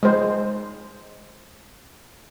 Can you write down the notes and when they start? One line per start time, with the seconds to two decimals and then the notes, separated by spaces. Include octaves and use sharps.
0.03 G#3 C5